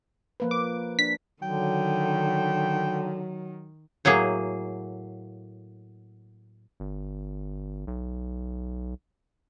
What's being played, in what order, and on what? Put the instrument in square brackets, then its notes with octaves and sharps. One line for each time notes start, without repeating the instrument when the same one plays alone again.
[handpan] F3 A#3 B4
[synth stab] D6
[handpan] D4 [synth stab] B6
[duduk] D3 [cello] D#3 [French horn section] F#3 [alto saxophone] G5
[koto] A2 F#3 A#3 G#4
[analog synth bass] G1
B1